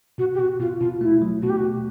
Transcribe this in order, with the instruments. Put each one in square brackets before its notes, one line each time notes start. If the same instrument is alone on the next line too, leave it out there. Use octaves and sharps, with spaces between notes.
[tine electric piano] B2 [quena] F#4
[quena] G4
[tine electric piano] B2 [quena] F#4
[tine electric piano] B2 [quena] F4
[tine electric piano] B2 [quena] F4
[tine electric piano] A3 [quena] E4
[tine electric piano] F#3
[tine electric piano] B2 [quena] F#4
[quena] G4
F#4
[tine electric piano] B2